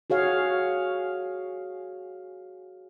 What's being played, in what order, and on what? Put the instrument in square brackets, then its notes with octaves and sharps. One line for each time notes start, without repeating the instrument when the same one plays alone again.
[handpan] F#4 G#4 C#5 F5